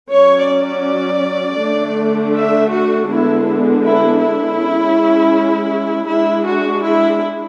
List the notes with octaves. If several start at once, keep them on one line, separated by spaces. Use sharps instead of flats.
F#3 C#4 C#5
D5
D3 A3 D4
E5
F#4
D3 G#3 B3 D4 E4
E4
E4
G#3 C#4
G#3 D4 E4
F#4
E4